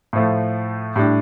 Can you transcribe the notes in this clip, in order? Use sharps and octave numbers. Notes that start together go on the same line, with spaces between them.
A2 F3 A3
A2 G3 D4